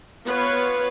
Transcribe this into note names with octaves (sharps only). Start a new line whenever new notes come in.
B3 F4 B4 C#5 F5